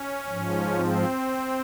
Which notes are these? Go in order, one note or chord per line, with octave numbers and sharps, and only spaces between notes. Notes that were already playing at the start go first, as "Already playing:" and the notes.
Already playing: C#4
G#2 F3
C4